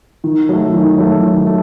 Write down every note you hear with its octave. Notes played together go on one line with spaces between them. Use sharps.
D#3
F#3 A3
D#3
F#3 A3
D#3
A3